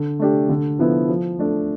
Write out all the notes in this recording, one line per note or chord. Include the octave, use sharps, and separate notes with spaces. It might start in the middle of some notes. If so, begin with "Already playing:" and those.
Already playing: D3
A3 D4 G4
D3
F3 B3 E4
F3
A3 D4